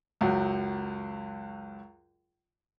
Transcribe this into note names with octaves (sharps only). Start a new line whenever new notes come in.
C#2 F#2 F#3